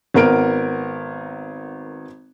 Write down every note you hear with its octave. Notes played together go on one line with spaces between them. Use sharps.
G#1 B3 A#4 D7